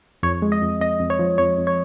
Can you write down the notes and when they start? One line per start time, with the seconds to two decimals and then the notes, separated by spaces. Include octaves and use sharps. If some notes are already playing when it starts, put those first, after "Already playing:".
0.23 F2 C#5
0.42 G#3
0.52 D#5
0.62 F2
0.80 F2 D#5
1.00 F2
1.10 C#5
1.19 F3
1.38 F2 C#5
1.58 F2
1.67 C#5